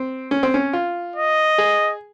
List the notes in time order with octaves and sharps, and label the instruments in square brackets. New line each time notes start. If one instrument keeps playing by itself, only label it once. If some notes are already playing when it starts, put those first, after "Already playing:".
Already playing: [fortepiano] C4
C#4
C4
C#4
F4
[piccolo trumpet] D#5
[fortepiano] G#4